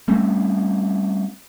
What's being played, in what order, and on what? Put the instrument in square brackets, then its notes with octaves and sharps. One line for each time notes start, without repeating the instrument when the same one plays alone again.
[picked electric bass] G3 A3 C4 C#4